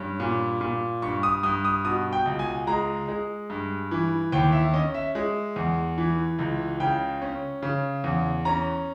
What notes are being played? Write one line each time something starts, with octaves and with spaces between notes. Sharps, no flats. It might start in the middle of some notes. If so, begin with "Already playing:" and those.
Already playing: G2 C#4
A#2
A#2
G2 C#6
D#6
G2 D#6
D#6
B2 D#6
G5
C#2
G#5
G#3 A#5
G#3
G2
E3
D#2 G5
E5
C#4 D#5
E5
G#3
E2
E3
C#2
C#3 G5
C#4
C#3
E2
C#4 A#5